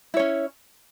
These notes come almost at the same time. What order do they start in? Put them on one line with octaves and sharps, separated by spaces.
E4 C#5 C#4